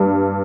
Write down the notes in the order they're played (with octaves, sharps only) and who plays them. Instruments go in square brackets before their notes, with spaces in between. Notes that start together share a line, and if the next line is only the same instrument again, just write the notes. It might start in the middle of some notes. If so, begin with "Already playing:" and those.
Already playing: [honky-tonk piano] G2